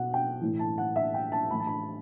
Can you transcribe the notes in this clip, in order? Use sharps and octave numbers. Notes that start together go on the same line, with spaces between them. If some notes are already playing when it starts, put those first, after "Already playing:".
Already playing: B2 F#5
G5
A2 E3
A5
F#5
E5
G5
A5
A2 E3 B5
A5
B5